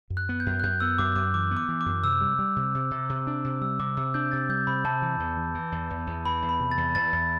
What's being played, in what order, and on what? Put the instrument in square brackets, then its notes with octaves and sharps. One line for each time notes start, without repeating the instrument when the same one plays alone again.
[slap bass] F#2
[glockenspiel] F#6
[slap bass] B3
[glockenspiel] G6
[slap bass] F#2
[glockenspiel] F#6
[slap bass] F#2 [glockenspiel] G6
[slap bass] B3 [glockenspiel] E6
[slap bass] F#2 [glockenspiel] D6
[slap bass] F#2 [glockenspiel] D6
[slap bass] E3 [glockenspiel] D6
[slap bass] B3
[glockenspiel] D6
[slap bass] E3
[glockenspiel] D6
[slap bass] F#2
[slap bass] C3 [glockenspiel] E6
[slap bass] G3
G3
C3
C3
C3
C3
D4
C3
[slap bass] G3 [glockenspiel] E6
[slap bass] C3 [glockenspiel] D6
[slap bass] C3 [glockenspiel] E6
[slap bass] D4 [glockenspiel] G6
[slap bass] C3 [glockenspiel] A6
[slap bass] G3 [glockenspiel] G6
[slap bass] C3 [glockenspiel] B5
[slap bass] C3 [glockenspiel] A5
[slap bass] E3
E2
E3
E3
E2
E2
E2
[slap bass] E3 [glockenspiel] B5
[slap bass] E2
[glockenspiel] B5
[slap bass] C3
[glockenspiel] A6
[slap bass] E2
[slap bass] E2 [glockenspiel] A6
[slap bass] E2